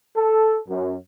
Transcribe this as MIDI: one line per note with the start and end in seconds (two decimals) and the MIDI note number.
0.16 0.60 69
0.68 0.94 42